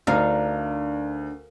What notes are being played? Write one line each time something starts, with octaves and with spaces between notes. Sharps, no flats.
D2 D4 D#4 A#4 F5